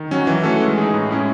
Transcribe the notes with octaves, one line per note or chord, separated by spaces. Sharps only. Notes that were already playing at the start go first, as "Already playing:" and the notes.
Already playing: D#3
F#3 C#4 F#4
E3
A3 C#4 F#4 A4
G#3
D#4 G#4
A2
G#3 C#4 E4